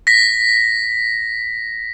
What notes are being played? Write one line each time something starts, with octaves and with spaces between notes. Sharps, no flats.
A#6 B6